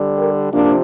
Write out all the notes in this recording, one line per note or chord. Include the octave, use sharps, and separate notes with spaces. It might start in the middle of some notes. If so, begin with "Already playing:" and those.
Already playing: D3 G3
G4 A#4
C3 F3 A#3 D4